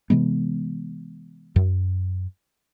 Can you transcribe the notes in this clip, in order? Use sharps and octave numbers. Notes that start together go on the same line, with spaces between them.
C3 E3 G#3 B3
F#2